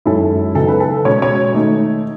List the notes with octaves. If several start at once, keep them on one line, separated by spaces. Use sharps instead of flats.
F#2 D#3 G#3 C#4 E4 A4
C#3 F#3 B3 D#4 A4
B4
A4
B2 G#3 C#4 C#5
C#5
D#3 A3 D#4